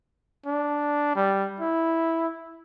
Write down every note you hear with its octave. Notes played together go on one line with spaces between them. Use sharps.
D4
G3
E4